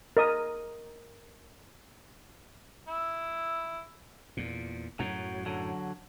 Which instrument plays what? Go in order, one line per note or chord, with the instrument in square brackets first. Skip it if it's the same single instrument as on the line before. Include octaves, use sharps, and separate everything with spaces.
[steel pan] A#4 D#5 D#6
[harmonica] E4
[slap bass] E2 A#2
[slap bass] F#2 A2 [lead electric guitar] F#3
[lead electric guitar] D3 F#3